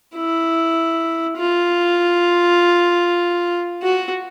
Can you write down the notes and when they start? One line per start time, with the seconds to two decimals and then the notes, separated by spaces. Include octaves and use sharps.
0.16 E4
1.38 F4
3.83 F#4